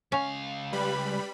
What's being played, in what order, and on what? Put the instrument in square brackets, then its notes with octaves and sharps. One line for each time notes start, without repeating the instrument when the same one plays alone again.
[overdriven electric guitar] C#2 F5 [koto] C#4
[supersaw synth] G3 B5 [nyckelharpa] B4